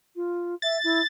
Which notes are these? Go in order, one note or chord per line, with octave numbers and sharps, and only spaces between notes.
F4
E5 A6
E4